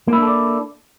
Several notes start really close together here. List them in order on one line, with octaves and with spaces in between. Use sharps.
A#3 E4 D4 A4 D5